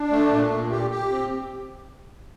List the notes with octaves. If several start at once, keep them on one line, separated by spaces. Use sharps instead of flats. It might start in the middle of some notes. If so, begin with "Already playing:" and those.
Already playing: D4
A3
A#2
A#2
G4
G4
C4